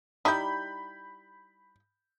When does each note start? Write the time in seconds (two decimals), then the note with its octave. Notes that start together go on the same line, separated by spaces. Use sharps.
0.25 G3 D#4 E4 B5 G6